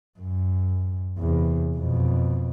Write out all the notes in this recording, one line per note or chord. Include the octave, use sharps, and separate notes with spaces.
F#2
E2 C3
F2 B2